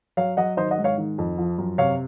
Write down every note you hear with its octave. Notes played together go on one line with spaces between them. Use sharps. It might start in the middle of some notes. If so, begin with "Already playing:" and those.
F#3 C#5 F5
F#3 D#5 F#5
D#3 C5 D#5
D#5 F#5
G#2
C#5 F5
D#3
F2
F3
F#2
C3 C#5 F5